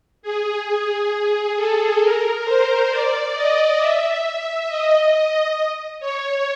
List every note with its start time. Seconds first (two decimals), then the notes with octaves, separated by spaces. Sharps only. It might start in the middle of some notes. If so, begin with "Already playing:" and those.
0.23 G#4
1.56 A4
2.01 A#4
2.45 C5
2.90 D5
3.34 D#5
3.78 E5
4.23 E5
4.67 D#5
6.00 C#5